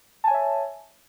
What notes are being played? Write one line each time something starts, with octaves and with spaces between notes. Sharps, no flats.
C#5 E5 G#5 A5